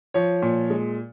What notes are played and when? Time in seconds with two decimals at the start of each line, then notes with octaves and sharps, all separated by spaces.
0.14 F3 C#5
0.42 A#2
0.70 G#3